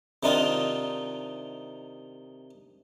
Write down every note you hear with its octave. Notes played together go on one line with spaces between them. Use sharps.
C3 D#3 D4 D#4 F4